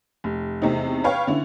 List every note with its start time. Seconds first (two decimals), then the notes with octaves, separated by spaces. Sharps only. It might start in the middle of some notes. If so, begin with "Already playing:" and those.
0.24 F1
0.62 E2 C3 A3 C4 D#4
1.04 B4 C#5 F5 G5
1.27 D3 C#4 E4